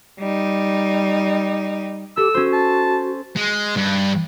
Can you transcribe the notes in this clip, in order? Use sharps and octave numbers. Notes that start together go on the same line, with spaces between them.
G3 D#4
G4 A4 E6
C#4 F#4 C5
A5
G#3
G2